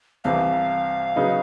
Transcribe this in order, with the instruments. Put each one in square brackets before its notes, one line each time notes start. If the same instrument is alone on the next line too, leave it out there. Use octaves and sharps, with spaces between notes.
[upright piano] C2 C3 E3 [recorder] F5
[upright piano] C#3 F#3 B3 D#4